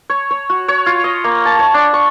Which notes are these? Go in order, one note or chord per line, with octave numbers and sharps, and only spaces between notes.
C#5
C#5
F#4
C#5
F4
D#5
A#3
A5
C#5
D4
C#6